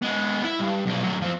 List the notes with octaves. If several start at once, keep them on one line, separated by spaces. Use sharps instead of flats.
G#3 B3
E4 E5
G2
B1 D5
F#3 A3
F3 C4